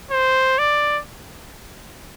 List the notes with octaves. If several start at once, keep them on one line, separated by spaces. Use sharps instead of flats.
C5
D5